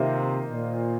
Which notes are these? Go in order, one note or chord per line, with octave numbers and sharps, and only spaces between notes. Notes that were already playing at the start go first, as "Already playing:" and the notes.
Already playing: C3 D#3 A#3 F4 C5 D#5
A#2